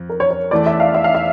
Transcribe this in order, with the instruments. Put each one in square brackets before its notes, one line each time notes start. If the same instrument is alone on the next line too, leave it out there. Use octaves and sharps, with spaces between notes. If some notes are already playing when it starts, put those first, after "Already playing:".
Already playing: [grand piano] F2
[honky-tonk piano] A#4
C#5
C#5
[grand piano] E2 E3 A3 [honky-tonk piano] D5
[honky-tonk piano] E5
F5
E5
F5
E5